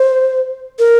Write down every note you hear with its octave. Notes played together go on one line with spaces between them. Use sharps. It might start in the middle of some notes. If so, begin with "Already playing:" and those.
Already playing: C5
A#4